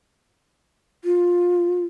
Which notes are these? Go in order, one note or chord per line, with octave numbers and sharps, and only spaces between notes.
F4